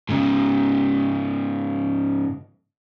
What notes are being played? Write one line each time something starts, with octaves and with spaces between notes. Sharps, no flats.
G#2 C#3